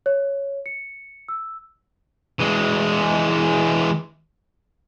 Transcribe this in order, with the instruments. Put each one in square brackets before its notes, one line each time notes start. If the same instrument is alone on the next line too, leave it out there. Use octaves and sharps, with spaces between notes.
[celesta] C#5
C#7
E6
[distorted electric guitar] E3 G#3